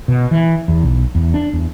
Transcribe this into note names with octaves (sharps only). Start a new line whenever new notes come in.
B2
E3
E2
B1
E2
D4
E2